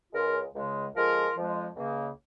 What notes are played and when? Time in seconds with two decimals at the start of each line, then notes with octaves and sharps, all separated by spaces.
0.13 C#2 C#3 G#3 F4 A#4
0.54 C#2 C#3 G#3
0.94 F2 F3 G#3 F4 A#4
1.35 F2 F3 G#3
1.76 C#2 C#3 A#3